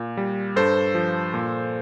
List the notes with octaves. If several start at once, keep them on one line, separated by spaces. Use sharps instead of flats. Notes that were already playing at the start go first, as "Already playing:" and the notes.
Already playing: A#2
G3
G2 A4 C5
F3
A#2